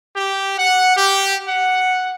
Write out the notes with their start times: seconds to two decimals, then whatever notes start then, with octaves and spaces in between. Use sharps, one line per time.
0.16 G4
0.58 F#5
0.97 G4
1.48 F#5